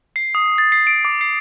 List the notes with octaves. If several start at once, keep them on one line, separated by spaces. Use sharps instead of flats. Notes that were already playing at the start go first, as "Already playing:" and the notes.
C7
D#6
A6
C7
D7
D6
C7